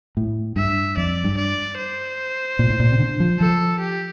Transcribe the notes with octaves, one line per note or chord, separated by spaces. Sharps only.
A2
G2 E5
F2 D5
G2
D5
C5
A#2
A2
A#2
C3
D3
F3
F3 A4
G4